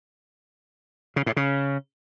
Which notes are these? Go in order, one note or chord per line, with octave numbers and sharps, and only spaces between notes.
C#3
A2
C#3